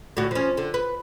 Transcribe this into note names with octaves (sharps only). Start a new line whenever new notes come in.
A2 D3 F#4
F3 C#4
D3
B4